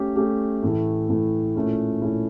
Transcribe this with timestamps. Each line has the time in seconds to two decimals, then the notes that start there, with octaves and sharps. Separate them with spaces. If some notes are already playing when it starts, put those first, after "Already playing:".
Already playing: A3 C#4 G4
0.16 A3 C#4 G4
0.63 A2 E3 A3
1.09 A2 E3 A3
1.55 A#2 A3 C#4 E4
2.02 A#2 A3 C#4 E4